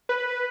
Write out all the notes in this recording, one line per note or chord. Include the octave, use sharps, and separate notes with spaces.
B4